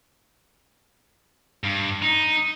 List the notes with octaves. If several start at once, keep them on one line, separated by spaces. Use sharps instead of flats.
G2
D#4